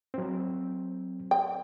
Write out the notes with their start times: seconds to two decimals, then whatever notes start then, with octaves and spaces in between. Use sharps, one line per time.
0.14 F#3 C4
1.31 G5